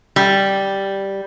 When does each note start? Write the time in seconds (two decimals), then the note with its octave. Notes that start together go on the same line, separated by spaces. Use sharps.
0.16 G3